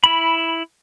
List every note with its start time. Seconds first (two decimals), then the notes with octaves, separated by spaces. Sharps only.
0.04 E4 B5